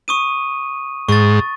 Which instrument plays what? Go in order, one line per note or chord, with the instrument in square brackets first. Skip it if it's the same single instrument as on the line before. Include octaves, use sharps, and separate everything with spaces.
[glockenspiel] C#6 D#6 D#7
[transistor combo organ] G#2 [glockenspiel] C#6 A6